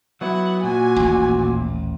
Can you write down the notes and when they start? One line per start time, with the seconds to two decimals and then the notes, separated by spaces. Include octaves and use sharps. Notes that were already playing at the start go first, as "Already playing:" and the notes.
0.21 F#3 B3 E4 F#5
0.63 A#2 F#4 G#5
0.96 D#1 A1